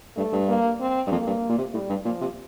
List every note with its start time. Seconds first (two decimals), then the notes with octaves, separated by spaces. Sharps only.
0.16 G2 A3
0.33 G2
0.48 A#3
0.80 C4
1.07 G2
1.11 F2 A#3
1.27 G2
1.49 A#2
1.58 C3
1.74 A2 G3
1.90 G2
2.05 A#2 F3
2.21 C3